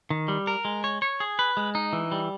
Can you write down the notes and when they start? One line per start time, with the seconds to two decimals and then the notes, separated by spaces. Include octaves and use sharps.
0.10 D#3
0.28 G3
0.47 A#4
0.65 G#3
0.84 C#5
1.02 C#5
1.20 G#4
1.39 B4
1.57 G#3
1.75 D#4
1.93 E3
2.12 G3